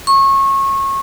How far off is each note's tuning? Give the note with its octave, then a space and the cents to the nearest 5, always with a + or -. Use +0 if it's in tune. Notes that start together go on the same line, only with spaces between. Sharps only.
C#6 -25